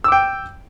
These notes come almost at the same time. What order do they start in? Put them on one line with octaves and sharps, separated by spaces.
E6 D6 G5